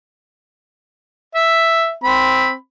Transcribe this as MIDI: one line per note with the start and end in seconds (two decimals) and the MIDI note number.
1.35 1.94 76
2.04 2.53 60
2.04 2.53 83